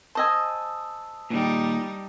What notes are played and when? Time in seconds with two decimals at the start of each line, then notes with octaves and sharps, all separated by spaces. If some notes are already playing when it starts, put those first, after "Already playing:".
0.15 C5 D#5 G#5 A5 D#6 E6
1.30 A#2 D#3 G3 D#4